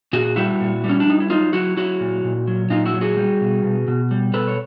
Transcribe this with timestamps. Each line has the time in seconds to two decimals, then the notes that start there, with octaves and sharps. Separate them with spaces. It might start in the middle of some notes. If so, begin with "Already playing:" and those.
0.13 A#2 F#4 G#4
0.36 G3 E4 F#4
0.60 A#2
0.84 G3
0.89 C#4
1.00 D4
1.07 G3 D#4
1.20 E4
1.30 F#3 D#4 F4
1.53 F#3 E4 F#4
1.77 F#3 E4 F#4
2.00 A#2
2.24 A#2
2.47 F#3
2.70 A#2 D#4 F4
2.86 E4 F#4
2.94 F#3
3.01 F#4 G#4
3.17 G3
3.41 B2
3.63 B2
3.88 B2
4.11 G3
4.34 B2 A4 B4
4.48 C#5